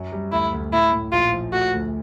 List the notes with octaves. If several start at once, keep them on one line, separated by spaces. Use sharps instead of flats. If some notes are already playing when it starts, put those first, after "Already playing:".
Already playing: F#2 F#3
G3
D2 E4
D2
A2 E4
A2
A#1 F4
F3
A3 F#4
D2